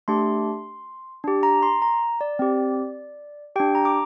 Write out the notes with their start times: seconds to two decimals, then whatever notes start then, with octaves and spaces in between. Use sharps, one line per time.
0.08 A3 D4 G4 C6
1.24 D4 G4
1.43 A#5
1.63 C6
1.82 A#5
2.21 D5
2.39 C4 G4
3.56 D4 G4 G5
3.75 A#5
3.85 D6